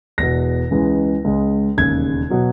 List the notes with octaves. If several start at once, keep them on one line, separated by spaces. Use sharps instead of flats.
E1 E2 B2 A#6
C#2 C#3 E3 G#3
C#2 C#3 G#3
E1 D#2 C#3 G#6
B2 F#3